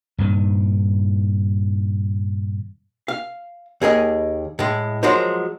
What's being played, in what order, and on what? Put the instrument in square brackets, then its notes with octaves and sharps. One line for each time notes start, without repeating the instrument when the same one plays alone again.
[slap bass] G2 A#2 D#3
[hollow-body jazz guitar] F5
D#2 G#4 A#4 D#5
A2 G#3
F3 F#3 G#3 F#4 A#4 C5